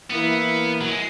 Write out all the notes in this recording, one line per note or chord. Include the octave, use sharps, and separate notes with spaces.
E3 A#3 B3 E4
F#3
G#3